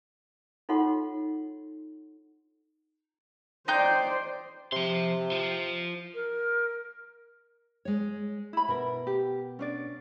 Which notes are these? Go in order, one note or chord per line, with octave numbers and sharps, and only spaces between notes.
D#4 F4 A4 C#5 F#5 C6
D#4 C5 D5 G5 G6
C3 F3 C6
F4 C5
A#4
G#3 C#5
E4 B5
B2 A#4
G4
C#4 D4 D5